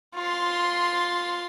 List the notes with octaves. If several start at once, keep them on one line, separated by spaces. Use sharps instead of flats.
F4 C6